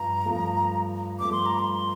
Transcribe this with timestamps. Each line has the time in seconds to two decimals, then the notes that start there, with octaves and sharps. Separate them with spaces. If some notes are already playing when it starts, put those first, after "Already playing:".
Already playing: G2 F3 A#5
0.25 G2 F3 A3
1.19 G2 F3 A3 D6
1.32 C6
1.46 A#5
1.59 C6